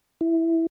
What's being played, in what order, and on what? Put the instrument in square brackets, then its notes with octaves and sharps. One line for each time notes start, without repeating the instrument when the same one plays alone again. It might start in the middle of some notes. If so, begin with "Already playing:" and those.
[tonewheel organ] E4